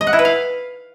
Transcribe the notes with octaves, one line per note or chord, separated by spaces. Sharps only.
D#5
F#5
E4
B4
F5